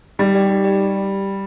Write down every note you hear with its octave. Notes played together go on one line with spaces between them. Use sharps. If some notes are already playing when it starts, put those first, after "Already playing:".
G3 D#4
G4 D5 G5
D#4
G4 D5 G5